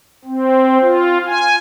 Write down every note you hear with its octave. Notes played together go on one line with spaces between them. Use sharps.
C4
F4
G#5